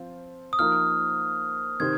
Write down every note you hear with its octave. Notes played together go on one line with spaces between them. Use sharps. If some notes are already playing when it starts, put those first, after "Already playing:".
Already playing: F3 C4 F4
D#6
F3 A#3 D#4 A#4 F6
C3 D#3 C4 D#4 C5 G#6